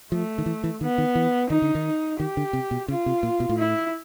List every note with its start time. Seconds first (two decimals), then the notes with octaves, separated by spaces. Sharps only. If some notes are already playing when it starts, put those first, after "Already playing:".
0.12 F3 A3
0.38 D#3
0.46 E3
0.64 E3
0.81 D#3 B3
0.98 D#3
1.15 E3
1.50 D#3 D#4
1.62 D3
1.75 D#3
2.19 D#3 G4
2.37 D3
2.53 C3
2.71 B2
2.88 C#3 F4
3.06 C3
3.23 A#2
3.40 B2
3.49 A2
3.58 E4